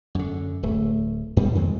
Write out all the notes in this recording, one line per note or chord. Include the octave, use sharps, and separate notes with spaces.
F#2 D3
D1 A3
F#2 B2 G3
F2 D#3 G#3 C4